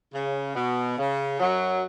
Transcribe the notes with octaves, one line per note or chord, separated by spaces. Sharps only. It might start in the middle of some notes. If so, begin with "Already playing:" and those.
C#3
B2
C#3
F#2 F#3